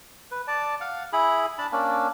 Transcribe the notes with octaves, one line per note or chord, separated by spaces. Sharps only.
B4
D5 A5
F5 F#5
E4 G#4 B5
D4 A5 B5
A#3 C#4 D4